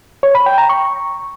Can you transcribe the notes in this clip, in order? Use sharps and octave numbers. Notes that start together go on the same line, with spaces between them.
C#5
B5
G5
A#5
C#6